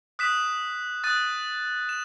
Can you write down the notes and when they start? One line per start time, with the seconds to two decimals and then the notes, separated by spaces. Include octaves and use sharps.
0.19 D#6 F#6 B6 E7
1.04 D#6 F#6 A6 D#7
1.89 E7